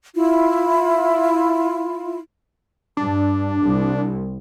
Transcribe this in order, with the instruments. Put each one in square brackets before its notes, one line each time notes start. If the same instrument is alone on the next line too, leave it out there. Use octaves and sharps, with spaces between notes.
[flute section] E4 F4
[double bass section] G2 [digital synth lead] D4
[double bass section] C2